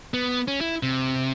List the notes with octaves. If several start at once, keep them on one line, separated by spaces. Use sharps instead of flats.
B3
C#4
E4
C3